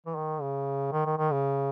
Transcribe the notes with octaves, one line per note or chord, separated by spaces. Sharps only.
E3
D#3
C#3
D#3
D#3
D#3
C#3